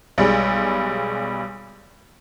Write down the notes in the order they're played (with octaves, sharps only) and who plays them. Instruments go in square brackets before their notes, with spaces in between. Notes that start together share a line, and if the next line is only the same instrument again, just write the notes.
[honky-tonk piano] B1 G3 G#3